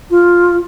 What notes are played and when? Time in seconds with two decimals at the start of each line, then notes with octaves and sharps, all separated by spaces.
0.10 F4